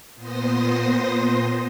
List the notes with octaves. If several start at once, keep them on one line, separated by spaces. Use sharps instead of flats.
A#2 B3 C5 C6 D#6 A#6